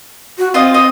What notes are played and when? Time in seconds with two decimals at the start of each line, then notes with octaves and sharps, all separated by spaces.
0.38 F#4
0.54 C4 F4 D#5
0.74 D#5